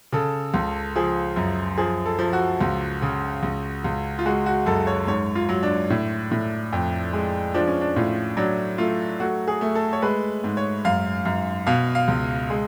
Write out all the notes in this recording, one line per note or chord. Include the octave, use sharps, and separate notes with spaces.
C#3 A4
C#2
F3 G#4
F#2
F3 G#4
A4
F3
F#4
C#2
C#3
C#2
C#2
F4
G#3 F#4
F#4
F#2 A4
C#5
G#2 C#5
F4
F#3
D4
A2
A2
F2
G#3
F3 D4
C#4
D4
A2 F4
F#3 D4
A3 F4
A3 F#4
G#4
A3
A4
C#5
G#3 B4
G#2
C#5
F#2 F5
F#2
B2 F5
F5
C#2
G#3